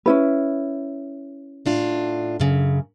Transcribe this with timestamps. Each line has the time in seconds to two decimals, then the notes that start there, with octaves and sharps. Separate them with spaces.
0.06 C#4 E4 B4
1.66 A2 D4 F4
2.40 F#2 C#3